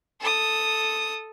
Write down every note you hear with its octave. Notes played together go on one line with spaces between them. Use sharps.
A4 D#6